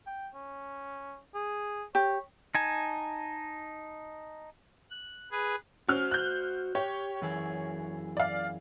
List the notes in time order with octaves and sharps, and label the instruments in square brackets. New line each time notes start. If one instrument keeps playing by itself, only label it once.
[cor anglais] G5
C#4
G#4
[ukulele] G4 [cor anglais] C#5
[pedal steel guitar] D#4 G#5 A5
[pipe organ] F#6
G#4 B4
[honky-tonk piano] C#4 F6 [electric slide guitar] F#4 C5
[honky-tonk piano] F#6 G6
[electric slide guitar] G4 [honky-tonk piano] C#5
[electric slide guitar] F#2 E3 G#4
[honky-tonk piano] D5 F5